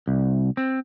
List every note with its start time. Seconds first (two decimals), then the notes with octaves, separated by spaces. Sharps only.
0.08 C2
0.57 C4